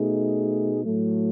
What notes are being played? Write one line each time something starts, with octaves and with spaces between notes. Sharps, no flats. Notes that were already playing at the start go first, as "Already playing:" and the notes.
Already playing: B2 A3 D#4 G#4
A2 F#3 A3